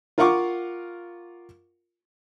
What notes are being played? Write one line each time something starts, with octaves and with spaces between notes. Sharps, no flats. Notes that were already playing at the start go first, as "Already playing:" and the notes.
F4 A#4 F5 F#5 C#6 D6